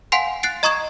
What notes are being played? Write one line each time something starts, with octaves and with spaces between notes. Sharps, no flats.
F5 F#5 G#5 C6 C7
F#6 A6 C7 D7
D#5 A#5 C#6 D#6 G#6 E7